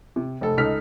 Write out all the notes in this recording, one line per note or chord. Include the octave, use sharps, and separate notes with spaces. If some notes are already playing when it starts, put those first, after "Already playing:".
C3
F1 A4
C#2 D#4 A4 F6 B6